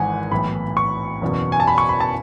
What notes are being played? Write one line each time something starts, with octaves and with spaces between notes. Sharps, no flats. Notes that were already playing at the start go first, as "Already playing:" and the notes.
Already playing: G#1 G#2 E3 F#5 G#5
B1 A2 E3 B5
C#6
F#1 E2 B2
G#5
A5
B5
C#6
B5
A5